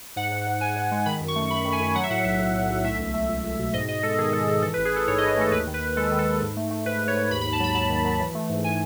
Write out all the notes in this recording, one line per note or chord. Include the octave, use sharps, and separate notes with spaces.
G#2 F#5
G#2
G#2
G#2 G#5
G#2
G#3
D#3 B5
F#2
C#6
A3
F#2 B5
D#3
G#5
F#2
F#3 F#5
E5
A2 F#5
B1 E5
A2
A2
B1
A3 E5
C#2
A3
C#2
C#2
B2
G#2 D#5
G#2 D#5
G#3 A4
D#3 G#4
G#3 A4
G#2 A4
E3 A4
B4
A1
G#4
A1 A4
G#2 C#5
D#5
E3
A3 A4
D#2 B4
D#3
B4
D#3
G#3 A4
D#3
A4
D#3
G#2
A3
A3
G#2 B4
G#2
C#5
G#2
D#2 B5
B5
D#2
A5
F#3 B5
F#3 A5
D#3
F#3
E3
A3
G#2
G#5